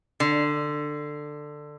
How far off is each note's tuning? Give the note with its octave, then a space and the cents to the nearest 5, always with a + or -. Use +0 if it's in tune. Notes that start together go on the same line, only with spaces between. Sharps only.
D3 +15